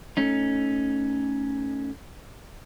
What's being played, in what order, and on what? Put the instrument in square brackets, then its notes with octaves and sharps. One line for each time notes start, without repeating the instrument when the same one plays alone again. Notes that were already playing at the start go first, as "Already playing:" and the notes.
[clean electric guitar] A3 C#4 D#4